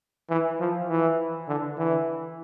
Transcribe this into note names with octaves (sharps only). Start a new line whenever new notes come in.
E3
F3
E3
D3
E3